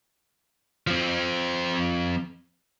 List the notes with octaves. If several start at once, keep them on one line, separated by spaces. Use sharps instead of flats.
F3 C4